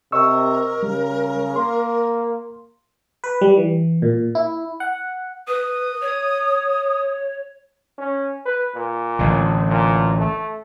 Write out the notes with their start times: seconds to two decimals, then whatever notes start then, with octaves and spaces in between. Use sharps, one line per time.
0.12 C3 A#4 D#5 C#6 E6
0.83 C#3 G3
1.56 A#3 C6
3.24 B4
3.41 G3
3.57 E3
4.02 A#2
4.35 E4
4.80 F#5
5.47 B4 D#6
6.01 C#5
7.98 C#4
8.46 B4
8.75 A#2
9.19 A1 D3
9.69 A#2
10.19 A3